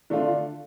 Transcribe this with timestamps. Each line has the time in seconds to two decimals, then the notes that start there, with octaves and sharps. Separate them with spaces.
0.10 D3 A3 D4 F4